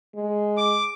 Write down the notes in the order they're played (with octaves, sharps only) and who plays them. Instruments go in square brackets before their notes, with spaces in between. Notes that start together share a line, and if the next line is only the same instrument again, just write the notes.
[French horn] G#3
[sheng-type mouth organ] D6